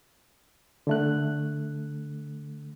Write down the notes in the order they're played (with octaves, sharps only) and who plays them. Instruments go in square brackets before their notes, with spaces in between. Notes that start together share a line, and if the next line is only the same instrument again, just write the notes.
[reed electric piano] D3 A3 F#6